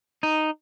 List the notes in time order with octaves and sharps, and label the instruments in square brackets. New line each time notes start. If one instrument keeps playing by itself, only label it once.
[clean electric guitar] D#4